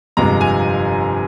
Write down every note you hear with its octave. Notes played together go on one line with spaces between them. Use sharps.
G1 F2 C3 F3 G#3 A#5
G#5